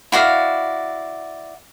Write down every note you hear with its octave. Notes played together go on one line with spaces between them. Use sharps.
E4 F#4 D5 F5